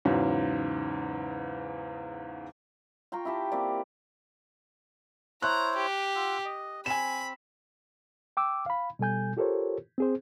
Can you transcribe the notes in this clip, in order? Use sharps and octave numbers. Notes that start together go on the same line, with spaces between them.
E2 G#2 C#3 F#3
F4 G5 A#5 C#6
E4 G4 A5
A#3 C4 D5
E4 C5 C#5 A#5 F#6
G4
F4 F#5 E6
D#5
C4 G#5 B5 E7
G5 D6 E6
F5 B5
B2 G3 A4 G#5 G6
F4 G4 A4 A#4 C5 C#5
C4 G#4 C5